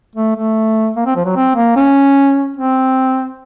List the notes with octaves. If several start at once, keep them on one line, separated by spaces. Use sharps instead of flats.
A3
A3
A#3
C4
F3
F#3
C4
A#3
C#4
C4